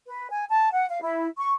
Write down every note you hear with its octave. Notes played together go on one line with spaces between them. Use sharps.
B4
G#5
A5
F#5
F5
E4
C#6